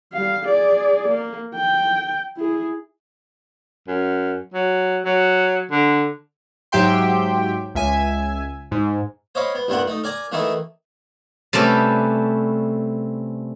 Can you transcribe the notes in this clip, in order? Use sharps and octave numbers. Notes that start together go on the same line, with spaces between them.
G3 F5
G#4 D5
A#3
G5
E4 G#4
F#2
F#3
F#3
D3
G#2 F#3 G4 E5 G5 C6
C#2 E5 G#5
G#2
C5 C#5 D#5 F5 B5 D6
B3
C2 G2 A#3 B3 F#5
A3 D#4
A#4 D5 G#5 A#5
D#3 E3 A3 A#3 D#4 E4
C3 G3 A3 C#4 B4 D5